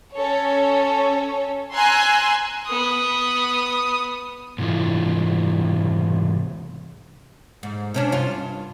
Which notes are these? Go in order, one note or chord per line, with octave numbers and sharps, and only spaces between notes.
C#4 A4 C#5
G#5 A#5 C6 E6 F#6 G#6
B3 D#6
G#2 C3 E3 E4 F4
G#2
C3 C#4 D4
G2 F4